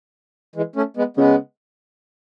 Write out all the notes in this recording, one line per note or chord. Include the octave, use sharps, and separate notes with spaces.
E3 G#3
A3 C#4
G#3 B3
C#3 G#3 B3